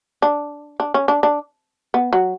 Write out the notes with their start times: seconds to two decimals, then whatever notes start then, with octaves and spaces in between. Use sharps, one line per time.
0.22 D4
0.80 D4
0.94 C#4
1.08 D4
1.23 D4
1.94 B3
2.13 F#3